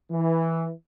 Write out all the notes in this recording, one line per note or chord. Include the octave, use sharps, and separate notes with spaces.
E3